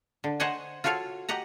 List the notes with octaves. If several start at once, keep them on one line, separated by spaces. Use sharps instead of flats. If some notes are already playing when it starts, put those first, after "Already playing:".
D3
C5 C#5 D#5 F#5 G#5
F4 F#4 A4 C#5 F5
G4 D#5 F#5 A#5